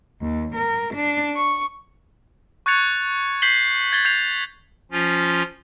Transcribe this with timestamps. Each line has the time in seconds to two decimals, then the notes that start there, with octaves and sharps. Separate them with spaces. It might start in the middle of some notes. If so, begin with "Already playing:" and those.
0.21 D#2
0.55 A#4
0.95 D4
1.36 C#6
2.66 C#6 F#6 G#6 A6 C#7 F7
3.42 G6 B6 C7 F#7 G7
3.92 G#6 A6 B6 G7
4.05 G6 C7 F7
4.92 F3 C#4 F4